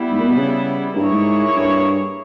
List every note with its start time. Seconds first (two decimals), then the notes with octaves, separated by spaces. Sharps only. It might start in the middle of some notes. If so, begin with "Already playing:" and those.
Already playing: G3 B3 E4
0.12 G#2
0.19 A#2
0.28 B2
0.37 C#3
0.96 G2 A#3 E4 G#4 C#5
1.12 G#2
1.56 G2